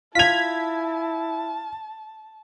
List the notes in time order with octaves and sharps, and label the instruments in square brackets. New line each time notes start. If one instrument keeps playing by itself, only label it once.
[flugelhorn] E4 [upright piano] F4 F7 [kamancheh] A5 [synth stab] G#6 B6